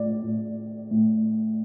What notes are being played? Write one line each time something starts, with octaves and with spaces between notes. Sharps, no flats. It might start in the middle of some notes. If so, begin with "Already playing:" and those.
Already playing: A2 D5
A2
A2